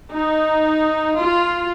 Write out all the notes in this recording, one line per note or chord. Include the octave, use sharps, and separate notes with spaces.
D#4
F4